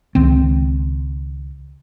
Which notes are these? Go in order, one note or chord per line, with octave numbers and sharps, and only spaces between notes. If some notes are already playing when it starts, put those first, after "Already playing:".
C#2 D#3 C4